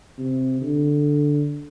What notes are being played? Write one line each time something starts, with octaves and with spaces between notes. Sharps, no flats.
C3
D3